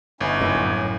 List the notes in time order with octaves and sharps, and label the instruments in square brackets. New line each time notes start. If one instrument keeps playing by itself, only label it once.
[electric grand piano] G1 [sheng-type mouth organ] C#4 D#4 E4
[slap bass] F#2 A2
[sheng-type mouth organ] C#5